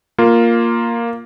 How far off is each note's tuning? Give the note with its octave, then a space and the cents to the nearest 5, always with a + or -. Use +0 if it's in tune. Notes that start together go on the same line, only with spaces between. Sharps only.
A#3 +0 F4 +0